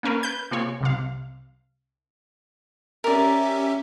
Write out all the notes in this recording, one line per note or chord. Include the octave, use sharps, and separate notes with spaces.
A#3 C#4 A#4 B4
B4 G6
C3 A#3 F4 G#4 C#5
C2 C3 F5
C#4 G4 A#4 D5 E5